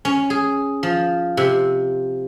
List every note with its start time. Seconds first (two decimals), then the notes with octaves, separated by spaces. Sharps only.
0.05 C#4
0.30 G#4
0.83 F3
1.37 C3